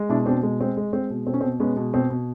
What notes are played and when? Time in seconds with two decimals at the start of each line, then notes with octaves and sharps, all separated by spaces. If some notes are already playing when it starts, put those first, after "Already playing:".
Already playing: G#3
0.09 B2 D4 E4
0.26 B2 C4 D4
0.43 G#3
0.61 G#3 C4
0.77 G#3
0.93 G#3 C4
1.10 B2
1.26 B2 C4
1.34 C#4
1.41 B2 C4
1.60 G#3 B3 C#4
1.76 B2
1.93 B2 C4
2.10 B2